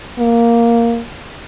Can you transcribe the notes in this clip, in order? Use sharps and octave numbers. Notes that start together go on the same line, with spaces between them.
A#3